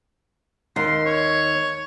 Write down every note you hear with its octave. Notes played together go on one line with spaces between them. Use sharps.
D#2 C6
C#5